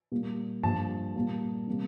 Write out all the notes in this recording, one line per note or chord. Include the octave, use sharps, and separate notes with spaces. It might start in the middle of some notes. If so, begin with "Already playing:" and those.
A#2 G3 A#3
G2 F3 A#3 A5
A#2 G3 A#3
C3 G3 A#3